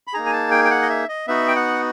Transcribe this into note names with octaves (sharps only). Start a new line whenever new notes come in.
B5
A#3 D#4 G#4 A#5
G#5
A5
G5
G5
F#5
D#5
E5
D#5
B3 D#4 F#4 E5
G5
F#5